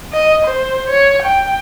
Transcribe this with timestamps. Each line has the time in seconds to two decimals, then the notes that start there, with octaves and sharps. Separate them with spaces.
0.13 D#5
0.45 C5
0.89 C#5
1.22 G5